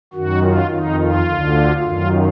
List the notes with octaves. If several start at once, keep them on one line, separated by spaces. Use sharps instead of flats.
F#2 D#3 F#4
F4
F2 D#3 D#4
F4
D2 D3
F#2 D#3 F4